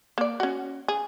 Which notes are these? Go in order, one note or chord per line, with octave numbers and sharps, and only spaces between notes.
A#3 D5
C#4 F#4
G#4